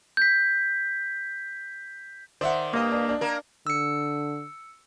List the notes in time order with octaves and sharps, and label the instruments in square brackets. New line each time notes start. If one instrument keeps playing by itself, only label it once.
[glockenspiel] G6 B6
[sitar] D#3 D5 [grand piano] C5 E5 F#5
[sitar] G2 D#5 [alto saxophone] A#3
[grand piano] D4
D4
[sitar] A#3 A#4
[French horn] D3 [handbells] E6 C#7